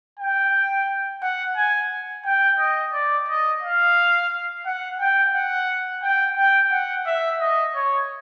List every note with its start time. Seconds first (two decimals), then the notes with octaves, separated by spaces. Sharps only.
0.19 G5
1.22 F#5
1.57 G#5
2.25 G5
2.59 D#5
2.93 D5
3.29 D#5
3.62 F5
4.66 F#5
5.00 G5
5.34 F#5
6.03 G5
6.37 G5
6.71 F#5
7.06 E5
7.40 D#5
7.75 C#5